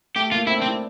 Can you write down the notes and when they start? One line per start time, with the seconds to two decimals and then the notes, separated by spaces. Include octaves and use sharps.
0.16 A3 G4
0.32 A#3 F4
0.47 C4 E4
0.57 D4
0.62 C4
0.68 E4